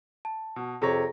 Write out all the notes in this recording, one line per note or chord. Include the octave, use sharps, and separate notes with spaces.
A5
B2
F2 C3 G#4 C#5 A#5 A#6